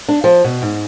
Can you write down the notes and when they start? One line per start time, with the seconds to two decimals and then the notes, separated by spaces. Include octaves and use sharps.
0.09 D4
0.24 F3
0.44 B2
0.62 G#2